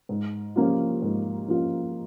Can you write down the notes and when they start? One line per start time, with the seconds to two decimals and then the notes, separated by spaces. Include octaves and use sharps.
0.09 G#2
0.56 F3 A#3 C#4 F4
1.02 G#2
1.48 F3 A#3 C#4 F4